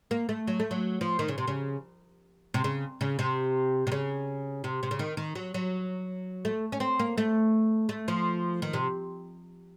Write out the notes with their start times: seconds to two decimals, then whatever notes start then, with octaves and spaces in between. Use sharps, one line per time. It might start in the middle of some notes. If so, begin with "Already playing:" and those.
0.11 A#3
0.29 A3
0.47 F#3
0.60 A3
0.71 F#3
1.01 F3
1.19 D#3
1.28 C#3
1.38 C3
1.47 C#3
2.54 C3
2.64 C#3
3.01 C#3
3.19 C3
3.87 C3
3.92 C#3
4.64 C3
4.83 C3
4.91 C#3
4.99 D#3
5.17 D#3
5.35 F#3
5.54 F#3
6.45 A3
6.72 C#4
6.80 C4
6.99 A#3
7.18 A3
7.89 A3
8.08 F3
8.62 D#3
8.73 C3